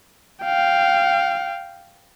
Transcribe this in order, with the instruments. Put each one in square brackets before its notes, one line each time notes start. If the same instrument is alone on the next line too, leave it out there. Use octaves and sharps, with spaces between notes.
[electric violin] F5 G5